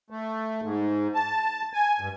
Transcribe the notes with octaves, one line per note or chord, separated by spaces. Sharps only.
A3
G#2
A5
G#5
G2